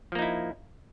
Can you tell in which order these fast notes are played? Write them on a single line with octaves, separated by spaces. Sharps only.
F3 A#3 D#4 E4